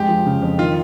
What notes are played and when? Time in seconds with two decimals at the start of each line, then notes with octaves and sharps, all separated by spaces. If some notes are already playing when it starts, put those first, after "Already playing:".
Already playing: F2 G#3 G4
0.09 F3
0.26 C#3
0.42 F2
0.58 D#3 F4